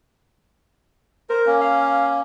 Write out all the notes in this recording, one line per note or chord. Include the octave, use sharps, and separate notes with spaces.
A#4 C5
A#3 C#4
F5